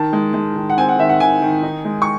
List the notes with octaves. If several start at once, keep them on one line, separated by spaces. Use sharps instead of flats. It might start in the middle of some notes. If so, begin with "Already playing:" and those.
Already playing: D#3 A5
G#3
G#3
D#3
F#5
C4 G#5
F#5
D#3 E5
F#5
D#3 G#5
D#3
D#4
G#3
C#6